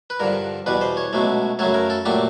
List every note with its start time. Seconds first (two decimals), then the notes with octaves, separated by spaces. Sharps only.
0.10 B4
0.20 G2 D3 F3 A#4
0.66 E2 B2 G3 B4
0.81 C5
0.97 C#5
1.13 C#2 B2 F#3 A3
1.59 F#2 C#3 F#3 A3 C#5
1.74 A#4
1.90 A4
2.05 A#2 F#3 A3 G4